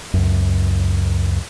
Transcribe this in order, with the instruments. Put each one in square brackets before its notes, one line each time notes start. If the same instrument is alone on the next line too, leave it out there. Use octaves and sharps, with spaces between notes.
[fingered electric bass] C#2 F#2